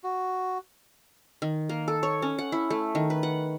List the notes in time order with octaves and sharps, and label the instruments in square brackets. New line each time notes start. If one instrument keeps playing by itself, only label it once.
[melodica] F#4
[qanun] D#3
A#3
A4
C#5
C#4
F#5
E4
A3
D#3
B4
F#5